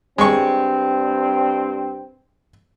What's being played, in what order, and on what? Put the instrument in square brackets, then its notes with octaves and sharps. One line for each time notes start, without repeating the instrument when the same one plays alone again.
[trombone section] G2 C4 [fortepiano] G#3 C#6